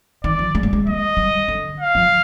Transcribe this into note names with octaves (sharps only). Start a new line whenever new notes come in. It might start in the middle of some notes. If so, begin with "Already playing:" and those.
D#3 D5
F3
G#3
A#3
G#3
A#3 D#5
G3
D3
F5
F3